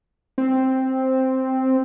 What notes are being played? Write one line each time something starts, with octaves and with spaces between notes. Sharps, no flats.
C4